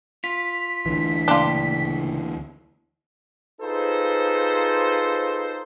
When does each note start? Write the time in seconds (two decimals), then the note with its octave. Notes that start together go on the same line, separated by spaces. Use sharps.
0.24 F4 B6
0.86 D2 D3 E3
1.28 C#2 A#2 D4 F4 G5
3.61 D#4 F4 G#4 A4 B4 C5